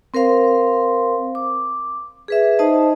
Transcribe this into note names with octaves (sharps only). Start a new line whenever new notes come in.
C4 A#4 C5 F5 C6
D6
G#4 B4 E5
D#4 C5 D#5 A5